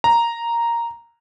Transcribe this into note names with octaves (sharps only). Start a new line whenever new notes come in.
A#5